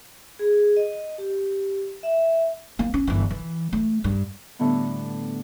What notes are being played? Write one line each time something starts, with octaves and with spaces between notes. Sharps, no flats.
G#4
D#5
G4
E5
A#3
C#4
G1 E3
E3
A3
G2
A2 D3 G3 B3